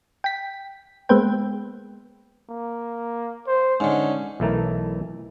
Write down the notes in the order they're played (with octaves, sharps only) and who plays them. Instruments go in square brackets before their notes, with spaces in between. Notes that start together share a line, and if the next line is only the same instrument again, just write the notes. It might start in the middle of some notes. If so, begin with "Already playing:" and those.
[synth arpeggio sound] G5 B6
G#3 A#3 B3 B4 C5 G5
[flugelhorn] A#3
C5
[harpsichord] G#2 D3 [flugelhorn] C#4
[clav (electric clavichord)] B1 E3 A3 A#4